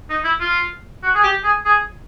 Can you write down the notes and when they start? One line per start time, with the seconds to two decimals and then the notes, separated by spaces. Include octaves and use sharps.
0.10 D#4
0.24 E4
0.40 F4
1.03 F#4
1.14 G#4
1.23 G4
1.44 G#4
1.65 G#4